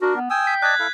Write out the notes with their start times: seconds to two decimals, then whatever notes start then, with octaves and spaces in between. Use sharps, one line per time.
0.02 D4 F#4 A#4
0.16 B3
0.30 G5 G#5 D#6 E6
0.47 B6
0.62 D5 D#5 A5 F#6 G#6
0.79 E4 A4 F5